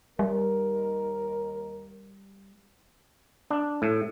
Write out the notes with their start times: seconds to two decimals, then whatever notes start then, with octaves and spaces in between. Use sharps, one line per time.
0.19 D#2 G3 A#4
3.51 D4
3.82 A2